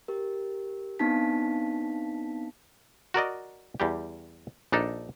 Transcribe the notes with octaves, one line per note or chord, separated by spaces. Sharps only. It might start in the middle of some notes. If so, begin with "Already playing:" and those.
G4 A#4
B3 C4 D4 D#4 A5 B6
F#4 A#4 D5 D#5
E2 G3 G4
A#1 D4 D#4 A4